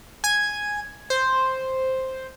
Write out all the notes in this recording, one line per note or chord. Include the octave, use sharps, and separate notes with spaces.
G#5 G#6 D#7
C5